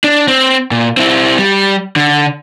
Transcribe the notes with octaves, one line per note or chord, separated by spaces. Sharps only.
D4
C4
A#2
C4 E4
G3
D3